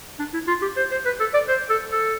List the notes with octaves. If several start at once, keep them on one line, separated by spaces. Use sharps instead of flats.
D4
E4
F4
G4
C5
C5
B4
A4
D5
C5
A4
A4